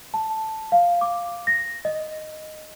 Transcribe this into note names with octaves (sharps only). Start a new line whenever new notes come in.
A5
F5
D6
A#6
D#5